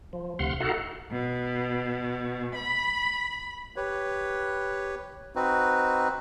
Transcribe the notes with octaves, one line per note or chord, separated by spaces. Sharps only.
F3
D2 C3 F5 F#5 C6
D#4 F#4 A4 F5 F#5
B2
B5
G4 B4 C#5
C4 D#4 F#4 B4